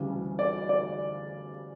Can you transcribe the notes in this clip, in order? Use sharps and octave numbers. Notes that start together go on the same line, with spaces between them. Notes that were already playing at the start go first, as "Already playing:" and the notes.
Already playing: D2 C#3 E3 G3
D5
D5